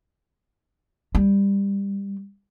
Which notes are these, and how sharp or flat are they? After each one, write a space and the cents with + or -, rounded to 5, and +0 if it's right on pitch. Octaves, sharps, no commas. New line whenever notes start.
G3 +20